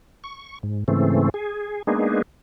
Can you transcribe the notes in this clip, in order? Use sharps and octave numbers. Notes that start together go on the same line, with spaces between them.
C#6
G#2
G#2 C#3 E3 A3 C4
G#4
G#3 A#3 B3 D4 D#4 G#4